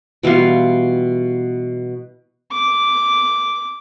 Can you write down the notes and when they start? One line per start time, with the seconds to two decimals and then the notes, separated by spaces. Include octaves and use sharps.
0.23 B2 E3 G3 F4
2.52 D6